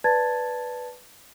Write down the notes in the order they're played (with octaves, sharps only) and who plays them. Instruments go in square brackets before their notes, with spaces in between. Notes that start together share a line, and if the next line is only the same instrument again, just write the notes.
[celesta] B4 D5 A5 G#6 A6